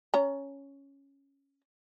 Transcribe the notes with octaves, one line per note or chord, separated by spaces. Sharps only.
C#4 A#5